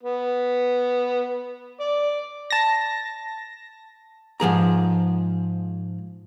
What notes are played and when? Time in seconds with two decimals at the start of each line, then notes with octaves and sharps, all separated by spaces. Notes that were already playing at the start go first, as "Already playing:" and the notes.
0.03 B3
1.80 D5
2.50 A5 A#6
4.40 G#2 F3 G#4 A#5